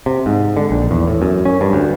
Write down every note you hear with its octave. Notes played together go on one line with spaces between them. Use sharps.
C3
G#2
D3
A#1
E2
A2
F#2
C#4
G2
D2